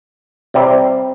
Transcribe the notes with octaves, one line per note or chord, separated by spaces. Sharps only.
C3 G3 C4 G4 C5